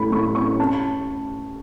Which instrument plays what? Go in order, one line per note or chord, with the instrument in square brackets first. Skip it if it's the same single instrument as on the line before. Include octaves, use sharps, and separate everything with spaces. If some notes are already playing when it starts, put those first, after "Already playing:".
Already playing: [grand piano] A2 A3 C#4 B5
A2 C#6
C#4 C#6
C#4 A5